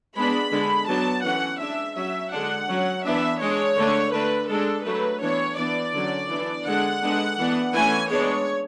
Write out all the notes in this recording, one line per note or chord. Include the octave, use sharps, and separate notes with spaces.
G#3 B3 D4 B5
D3 G#3 D4
F#3 B3 D4 A5
E3 A3 C#4 F#5
G#3 D4 E5
F#3 C#4 E5
D3 G#3 D4 F#5
F#3 C#4
E3 B3 D4 E5
G#3 D4 C#5
D3 A3 D4
D3 A3 D4 B4
G#3 D4 A4
F#3 A3 D4 B4
E3 B3 D4 C#5
E3 B3 D4 D5
D3 F#3 C#4
E3 B3 D4
D3 G#3 D4 F#5
D3 G#3 B3 D4
E3 B3 D4
E3 A3 C#4 G#5
G#3 B3 D4 C#5